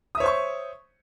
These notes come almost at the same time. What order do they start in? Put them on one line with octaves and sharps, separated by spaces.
D#6 E5 C#5 C5 C#6